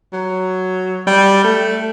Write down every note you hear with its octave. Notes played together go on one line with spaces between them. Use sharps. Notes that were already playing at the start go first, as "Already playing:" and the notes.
F#3
G3
A3